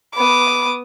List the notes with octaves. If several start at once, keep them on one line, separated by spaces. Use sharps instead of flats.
B3 B5 D6 D#6